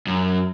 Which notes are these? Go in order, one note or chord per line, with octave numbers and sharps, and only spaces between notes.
F#2